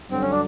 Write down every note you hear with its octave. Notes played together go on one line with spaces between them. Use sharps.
G2 D3 F#3 C4
C#4
D4